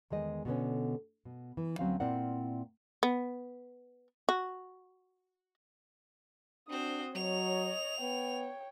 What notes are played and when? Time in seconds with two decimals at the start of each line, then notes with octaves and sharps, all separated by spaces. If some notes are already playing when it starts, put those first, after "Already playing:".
0.10 E2 D#3 G#3 D#5
0.45 B2 D3 B3 C#4
1.25 B2
1.57 E3
1.79 D2 F#3 C4 C#4 F5
2.00 A#2 C4 E4 A#4 D5 F#5
3.03 B3
4.29 F#4
6.69 C4 D4 F#4 C5 D#6
7.15 F#3 C#5 D#5 F7
8.01 B3 C#5 G5